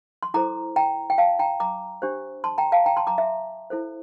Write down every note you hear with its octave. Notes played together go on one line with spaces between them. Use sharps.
C6
E4 A4 C5 A#5 D6
G5 A#5
G5
F5 A5
G5 A#5
A#5 D6
D4 G4 C5
A5 C6
G5 A#5
F5 A5
G5 A#5
A5 C6
A#5 D6
E5
E4 A4 C5